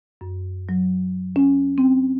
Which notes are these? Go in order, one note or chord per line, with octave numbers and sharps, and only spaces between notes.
F#2
F#3
C#4
C4